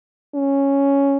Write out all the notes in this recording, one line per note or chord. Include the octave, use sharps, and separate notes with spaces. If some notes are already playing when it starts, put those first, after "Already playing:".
C#4